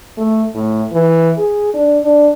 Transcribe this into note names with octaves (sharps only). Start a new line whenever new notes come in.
A3
A2
E3
G#4
D4
D4